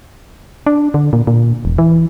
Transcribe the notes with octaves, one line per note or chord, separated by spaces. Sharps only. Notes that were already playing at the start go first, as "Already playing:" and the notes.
D4
D3
A#2
A#2
E1
E3